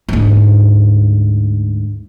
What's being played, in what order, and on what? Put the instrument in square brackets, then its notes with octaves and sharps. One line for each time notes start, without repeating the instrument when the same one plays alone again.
[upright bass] D2 G#2